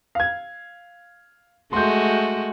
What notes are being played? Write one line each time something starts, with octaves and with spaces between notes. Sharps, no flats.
F5 G#6
G#3 A3 F#4 C6 G6